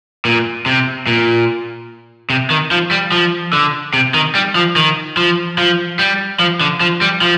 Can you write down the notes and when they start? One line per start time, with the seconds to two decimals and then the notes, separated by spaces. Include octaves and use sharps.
0.25 A#2
0.66 C3
1.07 A#2
2.30 C3
2.50 D#3
2.71 F3
2.91 G3
3.12 F3
3.53 D3
3.94 C3
4.14 D#3
4.35 G3
4.55 F3
4.76 D#3
5.17 F3
5.58 F3
5.99 G3
6.40 F3
6.60 D3
6.80 F3
7.01 G3
7.21 F3